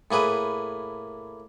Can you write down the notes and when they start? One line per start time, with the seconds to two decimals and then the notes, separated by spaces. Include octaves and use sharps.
0.11 A2 A#3 G#4 B4